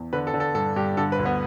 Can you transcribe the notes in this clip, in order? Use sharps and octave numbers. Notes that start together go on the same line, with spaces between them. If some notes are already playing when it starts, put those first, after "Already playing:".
Already playing: E2
D3 B4
A4
D3
A4
G2 A4
G2 G4
D3 A4
B4
D2
B3